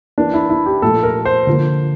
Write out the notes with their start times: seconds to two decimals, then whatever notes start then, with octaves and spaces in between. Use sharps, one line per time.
0.18 E3 A#3 D4
0.34 E4
0.50 E4
0.66 G4
0.82 A#2 F3 A3 A4
1.03 A#4
1.25 C5
1.47 D3 F3 A#3